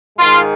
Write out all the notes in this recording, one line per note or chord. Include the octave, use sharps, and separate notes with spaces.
G#2 D#3 G#3 F4